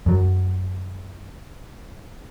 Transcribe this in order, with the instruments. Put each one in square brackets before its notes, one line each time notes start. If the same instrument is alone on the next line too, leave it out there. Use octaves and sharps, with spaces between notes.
[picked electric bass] F#2 F#3